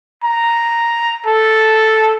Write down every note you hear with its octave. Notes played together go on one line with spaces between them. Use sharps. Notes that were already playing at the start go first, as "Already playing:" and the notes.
A#5
A4